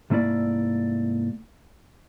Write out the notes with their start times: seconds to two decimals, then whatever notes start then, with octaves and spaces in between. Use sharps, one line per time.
0.10 C2 G#2 A3 A#3 E4 D5